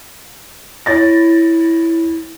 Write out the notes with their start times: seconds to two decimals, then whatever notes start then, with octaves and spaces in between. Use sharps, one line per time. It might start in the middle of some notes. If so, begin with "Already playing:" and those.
0.86 E4 C#5 A6 A#6